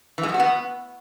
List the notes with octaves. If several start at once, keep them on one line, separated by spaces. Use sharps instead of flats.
E3
G#3
F#3
F#4
B3